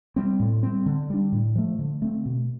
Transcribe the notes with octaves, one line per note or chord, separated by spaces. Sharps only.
G3 C4
A2
G3 C4
D3
G3 D4
A2
F3 A3
D3
A3 C4
B2